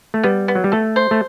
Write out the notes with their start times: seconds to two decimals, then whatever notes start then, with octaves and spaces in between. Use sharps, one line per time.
0.14 A3
0.23 G3 B3
0.48 B3
0.55 F#3
0.64 G3
0.72 A3 A4
0.96 C5
1.11 A3